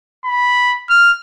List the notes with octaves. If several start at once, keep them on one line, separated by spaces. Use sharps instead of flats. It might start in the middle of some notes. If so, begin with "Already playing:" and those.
B5
F6